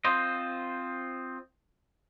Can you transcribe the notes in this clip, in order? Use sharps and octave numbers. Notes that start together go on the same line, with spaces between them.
C4 F4 C5 D#5